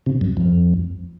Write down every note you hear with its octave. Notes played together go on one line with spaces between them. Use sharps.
C3
F#2
F2